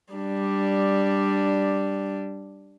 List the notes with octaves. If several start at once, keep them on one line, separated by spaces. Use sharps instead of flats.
G3 D4